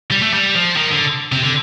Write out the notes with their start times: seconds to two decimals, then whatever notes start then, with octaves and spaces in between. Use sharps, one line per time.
0.11 G3
0.22 A3
0.34 G3
0.55 F3
0.76 D#3
0.91 D3
1.32 C3
1.43 D3